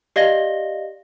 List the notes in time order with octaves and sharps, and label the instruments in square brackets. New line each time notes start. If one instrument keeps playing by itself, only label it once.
[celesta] G4 D5 D#5 F5 A#6 G7